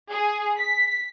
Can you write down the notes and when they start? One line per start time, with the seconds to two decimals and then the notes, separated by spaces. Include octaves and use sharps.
0.12 G#4
0.60 B6